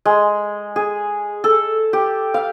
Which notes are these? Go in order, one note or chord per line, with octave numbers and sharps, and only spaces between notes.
G#3
G#4
A4
G4
F5